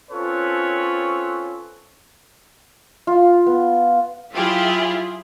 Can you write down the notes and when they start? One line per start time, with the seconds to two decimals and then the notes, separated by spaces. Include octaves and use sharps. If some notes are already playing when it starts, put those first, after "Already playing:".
0.11 C4 C#4 F4 A4 B4 C#5
3.07 F4
3.46 B3
4.33 F#3 E4 F4 G4 G#4